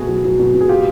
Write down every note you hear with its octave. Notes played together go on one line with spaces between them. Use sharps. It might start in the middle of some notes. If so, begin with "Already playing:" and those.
Already playing: B2 A3 F#4 G#4
F#3
F#3
B2
B2
G#4
G3 F4 G4